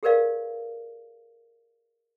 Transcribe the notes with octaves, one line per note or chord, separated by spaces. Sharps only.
G4 G#4 A#4 B4 D5 F5